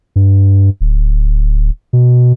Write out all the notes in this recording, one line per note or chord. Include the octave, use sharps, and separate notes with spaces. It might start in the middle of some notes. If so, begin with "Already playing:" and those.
G2
D1
B2